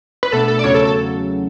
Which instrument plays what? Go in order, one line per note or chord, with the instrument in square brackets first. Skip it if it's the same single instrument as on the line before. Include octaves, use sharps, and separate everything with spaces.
[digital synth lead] B4
[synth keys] B2 A3 D4 [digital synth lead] A4
[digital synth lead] A4
D5
[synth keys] E2 C#3 F#3 A3 C#4 [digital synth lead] C#5
[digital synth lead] A4
A4